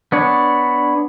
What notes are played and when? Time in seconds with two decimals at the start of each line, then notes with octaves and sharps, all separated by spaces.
0.12 B3 D4 C#5